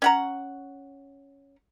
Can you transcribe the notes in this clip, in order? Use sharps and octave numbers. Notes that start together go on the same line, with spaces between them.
C#4 F#5 A#5